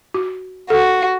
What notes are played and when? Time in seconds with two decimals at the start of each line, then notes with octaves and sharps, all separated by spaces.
0.14 F#4
0.70 F#4 A4